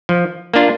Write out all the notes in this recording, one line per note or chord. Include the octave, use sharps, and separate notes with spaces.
F3
A#3 D4 F4